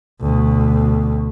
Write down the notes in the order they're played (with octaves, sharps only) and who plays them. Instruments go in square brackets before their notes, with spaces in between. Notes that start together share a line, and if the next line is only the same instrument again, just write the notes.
[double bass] D2 B2